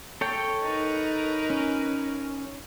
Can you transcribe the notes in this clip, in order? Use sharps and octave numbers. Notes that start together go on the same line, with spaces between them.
A4 C#5 G5
D#4 A#4 B4
C#4